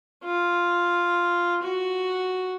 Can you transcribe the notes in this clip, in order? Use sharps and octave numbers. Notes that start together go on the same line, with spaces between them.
F4
F#4